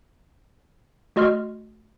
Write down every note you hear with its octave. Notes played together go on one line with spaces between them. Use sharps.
A3 F#4 D#5 C6 F6